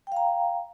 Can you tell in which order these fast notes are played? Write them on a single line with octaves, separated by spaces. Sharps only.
G5 F5 A#5